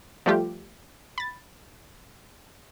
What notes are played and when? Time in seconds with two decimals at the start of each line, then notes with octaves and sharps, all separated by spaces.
0.26 F3 G3 A3 F4 G4
1.18 B5 A6